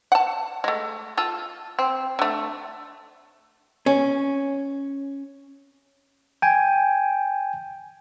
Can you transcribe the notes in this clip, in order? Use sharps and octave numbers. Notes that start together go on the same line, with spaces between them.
F#5 A5
G#3 A3
F4 A4
C4
D3 A3
C#4
G5 G#5